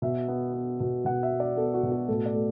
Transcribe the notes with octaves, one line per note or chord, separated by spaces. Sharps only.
B2 E5
B3
B3
B2
B2 F#5
E5
B3
D5
B3 A4
F#4
B2
F#4
A2 A4
D5
A3